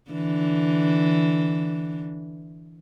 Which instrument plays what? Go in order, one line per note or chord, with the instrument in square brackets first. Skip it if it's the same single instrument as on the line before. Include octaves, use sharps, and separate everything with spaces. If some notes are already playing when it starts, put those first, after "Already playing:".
[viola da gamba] D3 E3